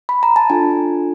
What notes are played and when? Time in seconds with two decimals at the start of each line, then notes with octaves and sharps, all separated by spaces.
0.09 B5
0.23 A#5
0.36 A5
0.50 D4 F4 A4 G#5